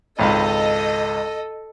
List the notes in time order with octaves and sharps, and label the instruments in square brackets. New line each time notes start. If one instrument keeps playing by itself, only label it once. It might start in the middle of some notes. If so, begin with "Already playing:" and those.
[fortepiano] G#1 C#2 B5 [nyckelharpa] A4 [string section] D#5